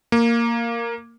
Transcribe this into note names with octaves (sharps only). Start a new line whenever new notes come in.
A#3